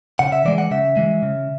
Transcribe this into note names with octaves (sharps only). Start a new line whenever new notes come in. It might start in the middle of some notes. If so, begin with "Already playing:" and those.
C#3 F#5
E5
E3 G#3 D5
F#5
C#3 E5
E3 G#3
C#3